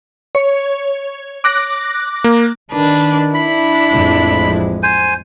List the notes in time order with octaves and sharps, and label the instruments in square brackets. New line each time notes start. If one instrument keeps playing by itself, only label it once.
[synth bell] C#5
D6 F#6 A#6
[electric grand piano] A#3
[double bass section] D#3 [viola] D4 B4
[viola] D4 E4 [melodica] B5
[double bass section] A1 F2 G#3
[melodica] C5 G#5